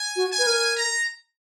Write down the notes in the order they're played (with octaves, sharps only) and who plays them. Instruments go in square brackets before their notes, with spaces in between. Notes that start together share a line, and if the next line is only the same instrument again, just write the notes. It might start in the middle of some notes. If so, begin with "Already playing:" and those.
Already playing: [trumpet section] G#5
[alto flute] F#4
[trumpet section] G#5
[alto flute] B4
A#4
[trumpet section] A#5